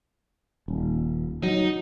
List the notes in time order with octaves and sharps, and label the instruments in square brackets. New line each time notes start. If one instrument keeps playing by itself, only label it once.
[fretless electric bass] D#1
[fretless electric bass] F#3 [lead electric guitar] D#4